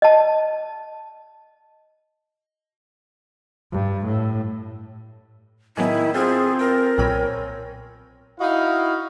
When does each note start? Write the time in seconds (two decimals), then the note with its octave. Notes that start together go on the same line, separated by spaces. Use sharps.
0.02 D#5 A5
3.72 G2
4.06 A2
5.77 A2 D#3 F#3 B3 E4 G#4 A5 D#6
6.14 C4 F4 G#4 A4 C5
6.59 A#4 G5
6.98 B1 A#2 C4 C#5 G#5 B5
8.40 D#4 E4 F#4 D#5 F5